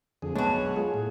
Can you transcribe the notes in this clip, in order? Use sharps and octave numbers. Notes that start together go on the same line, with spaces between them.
F2 D3 G#4
B1 G#3 D4 F#4 B4 C#5
F4 G#4
A2